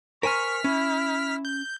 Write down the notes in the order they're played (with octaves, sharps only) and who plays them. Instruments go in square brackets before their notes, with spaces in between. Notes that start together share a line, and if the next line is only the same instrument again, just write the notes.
[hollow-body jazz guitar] A#4 C5 G#5 [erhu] C#6 [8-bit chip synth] F6 B6
[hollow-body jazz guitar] C#4 [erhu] E4
[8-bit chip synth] G6